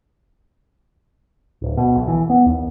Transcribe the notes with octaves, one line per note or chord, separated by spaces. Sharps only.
D1
B2
B1
E3
B3
D#2